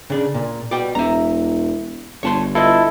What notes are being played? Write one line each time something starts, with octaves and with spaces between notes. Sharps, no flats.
C#3 D4
A#2
B2 D5 G5
E1 E5 A#5
G1 C#5 A5 C6
E4 F4 A4 B4 D#5